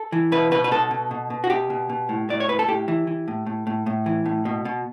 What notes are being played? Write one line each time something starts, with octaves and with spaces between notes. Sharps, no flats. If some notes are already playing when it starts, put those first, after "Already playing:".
Already playing: A4
E3
B2 B4
B2 B4
B4
B2 A4
B2
B2
B2
F#4
B2 G4
B2
B2
A2
A2 D5
C#5
A2 B4
A4
A2 G4
E3
E3
A2
A2
A2
A2
E3
A2
B2
B2